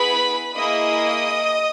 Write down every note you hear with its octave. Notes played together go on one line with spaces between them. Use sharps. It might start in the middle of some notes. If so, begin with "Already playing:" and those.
Already playing: B3 E4 G#4 B4 B5
A#3 E4 G#4 D#5 D#6